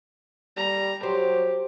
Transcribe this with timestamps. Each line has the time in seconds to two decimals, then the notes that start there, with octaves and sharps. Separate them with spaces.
0.57 G3 A#5
1.03 F#3 G4 C5